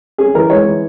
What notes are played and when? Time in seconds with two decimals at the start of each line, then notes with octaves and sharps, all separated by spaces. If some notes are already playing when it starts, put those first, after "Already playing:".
0.18 C#4 G#4
0.35 E3 A#4
0.50 G#3 C#5
0.66 E3